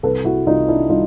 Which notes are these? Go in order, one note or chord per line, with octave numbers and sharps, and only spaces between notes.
C2 A4 B4
E4 F#4
C2 D#4 F4
D4 E4
G3 D#4 F4